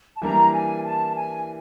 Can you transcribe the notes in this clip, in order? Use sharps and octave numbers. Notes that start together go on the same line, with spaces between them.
A5
E3 G3 A#3 D4 A#5
G#5
A5
G#5